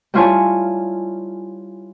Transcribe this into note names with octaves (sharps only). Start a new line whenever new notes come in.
G3 E4 F4 C#5 G#5 A5